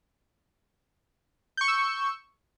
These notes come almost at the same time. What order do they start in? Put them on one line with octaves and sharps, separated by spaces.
G6 C#6 C#7 E6